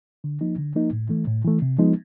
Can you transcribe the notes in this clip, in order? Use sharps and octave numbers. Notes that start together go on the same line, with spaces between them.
D3
F3 A#3 D#4
D3
F3 A#3 D#4
A2
E3 A3
A2
E3 A3
C3
F3 G#3 B3 D#4